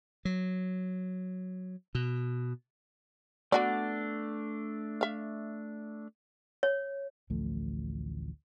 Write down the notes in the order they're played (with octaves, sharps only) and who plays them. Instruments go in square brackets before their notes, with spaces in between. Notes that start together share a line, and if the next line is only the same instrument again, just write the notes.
[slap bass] F#3
B2
[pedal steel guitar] A3 D4 [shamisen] B3 F#4 D5
[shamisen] E5 F5
[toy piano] C#5
[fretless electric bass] A1 D2 F3 A3